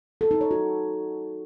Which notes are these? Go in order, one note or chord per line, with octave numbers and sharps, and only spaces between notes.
A4
D#4
C#5
F#4